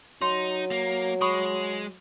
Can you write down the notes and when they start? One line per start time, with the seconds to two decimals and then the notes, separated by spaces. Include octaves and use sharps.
0.22 F#3 D#4 C6
0.71 A#3
1.21 G#3 B5 C#6 D#6